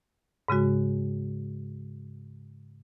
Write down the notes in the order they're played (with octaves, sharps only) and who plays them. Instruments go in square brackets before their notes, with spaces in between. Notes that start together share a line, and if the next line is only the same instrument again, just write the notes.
[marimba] G#2 C#3 G#3 F#4